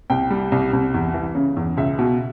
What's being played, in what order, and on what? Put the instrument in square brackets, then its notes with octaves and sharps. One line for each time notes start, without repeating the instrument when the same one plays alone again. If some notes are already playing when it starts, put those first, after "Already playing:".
[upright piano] C2 G5
G3
C2
C2
E2
E3
C#3
E2
C#2 E5
B2